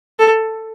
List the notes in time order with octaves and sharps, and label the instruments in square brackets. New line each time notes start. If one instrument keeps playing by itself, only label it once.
[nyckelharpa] A4